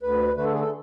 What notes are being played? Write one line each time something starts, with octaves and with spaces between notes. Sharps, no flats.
D2 B4
D3 A3 B4
A4
G#4
A4